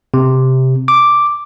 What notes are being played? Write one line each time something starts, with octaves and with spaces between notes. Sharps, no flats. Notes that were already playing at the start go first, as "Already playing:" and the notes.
C3
D6